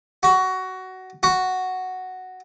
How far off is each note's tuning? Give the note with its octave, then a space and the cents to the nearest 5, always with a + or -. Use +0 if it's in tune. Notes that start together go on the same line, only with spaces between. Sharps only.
F#4 +15
F#4 +0